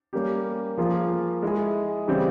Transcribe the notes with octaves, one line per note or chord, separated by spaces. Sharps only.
G3 A#3 C#4 G4
F3 A#3 F4 G#4
G#3 E4 G#4
C#3 E3 G3 C4 G4